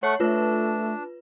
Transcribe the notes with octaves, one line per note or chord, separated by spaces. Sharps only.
A3 C#5 F#5 C#6
A3 D4 F4 B4